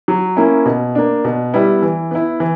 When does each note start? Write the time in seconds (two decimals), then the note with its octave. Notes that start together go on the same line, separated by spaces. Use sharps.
0.08 F#3
0.37 A#3 C#4 E4
0.66 B2
0.95 A#3 D4
1.25 B2
1.54 G3 B3 E4
1.82 E3
2.11 B3 E4
2.40 E3